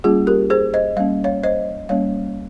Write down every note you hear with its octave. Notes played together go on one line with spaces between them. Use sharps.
G3 A#3 C#4 F4 G#4
G4 A#4
G#4 C5
C5 D#5
G3 A#3 C#4 F5
C#5 F5
C5 D#5
G3 A#3 C#4 C#5 F5